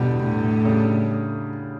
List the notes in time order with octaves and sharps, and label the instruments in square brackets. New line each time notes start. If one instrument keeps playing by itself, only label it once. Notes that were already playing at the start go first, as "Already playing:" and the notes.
Already playing: [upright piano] E2 D3 G3 D4 [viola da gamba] B2
[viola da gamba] A2
[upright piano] C#3 G3 D4